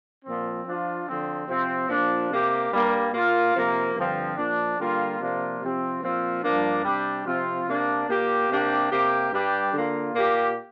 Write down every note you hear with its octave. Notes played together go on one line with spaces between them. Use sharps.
A#2 F3 C4
F3 D4 F4
D3 F3 C4
C3 F3 C4
A#2 F3 D4
C3 A#3 G4
G2 G3 A#3
A#2 A#3 F4
C3 F3 A#3
G2 D3 F3 C4
A#2 F3 D4
D3 G3 A#3 F4
C3 F3 A#3 D4 F4
C3 F3 C4 G4
A#2 F3 C4 F4
G2 F3 A#3 D4
C3 G3 D4 G4
C3 F3 C4 F4
C3 A#3 D4
A#2 A#3 G4
C3 A#3 D4 G4
C3 A#3 G4
G2 G3 D4 G4
D3 A#3 F4
A#2 A#3 G4